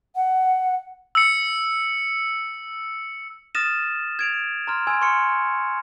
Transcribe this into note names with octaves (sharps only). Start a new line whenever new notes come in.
F#5
E6 C#7
D#6 F6 A6 A#6 D#7 E7
G#6 D7 F7
A#5 C6 F6
G#5 C6 E6 G#6
C6 C#6 F6 C#7